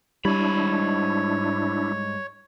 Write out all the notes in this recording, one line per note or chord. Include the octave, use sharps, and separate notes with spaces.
G#2 G3 D4 E4 C#5 B5